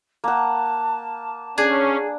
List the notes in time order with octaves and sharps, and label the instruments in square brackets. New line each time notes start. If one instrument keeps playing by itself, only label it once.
[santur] A#3 F#5 [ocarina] A5
[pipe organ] C#4 [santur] D4 [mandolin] G#4